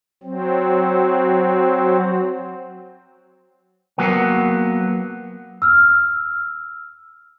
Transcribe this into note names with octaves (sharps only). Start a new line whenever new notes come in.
F#3 C4
F#3 A#3 B3
E6 F6